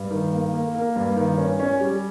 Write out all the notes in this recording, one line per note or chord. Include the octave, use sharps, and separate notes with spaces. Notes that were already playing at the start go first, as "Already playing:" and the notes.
Already playing: G2
D#3
A#3
A#3
A#3
G2
D#3
C#4
C#4
G3